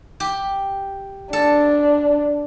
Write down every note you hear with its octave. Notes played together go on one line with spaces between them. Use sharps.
G4
D4 A4